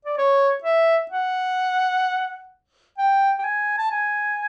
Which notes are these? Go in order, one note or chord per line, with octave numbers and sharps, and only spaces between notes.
D5
C#5
E5
F#5
G5
G5
G#5
A5
G#5